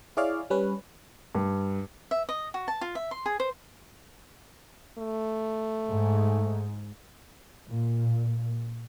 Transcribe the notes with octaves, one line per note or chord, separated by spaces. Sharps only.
E4 G#4 C#5 D5 F5
G3 C#4 B4
G2
E5
D#5
F#4
A5
F4
E5
C6
G#4
C5
A3
G#2
A#2